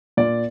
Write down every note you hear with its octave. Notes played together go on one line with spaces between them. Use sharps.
A#2 D5